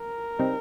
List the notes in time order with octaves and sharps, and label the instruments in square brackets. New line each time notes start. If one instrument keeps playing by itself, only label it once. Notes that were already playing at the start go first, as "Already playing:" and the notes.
Already playing: [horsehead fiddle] A#4
[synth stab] C3 G3 C4 D#4